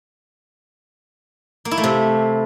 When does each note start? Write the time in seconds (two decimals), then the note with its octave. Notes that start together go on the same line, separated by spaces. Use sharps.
1.65 A#3
1.71 E4
1.77 A3
1.84 C3